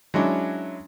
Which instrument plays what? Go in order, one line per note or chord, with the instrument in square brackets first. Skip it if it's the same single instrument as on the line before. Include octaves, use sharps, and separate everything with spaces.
[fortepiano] F#3 G#3 C#4 D4 E4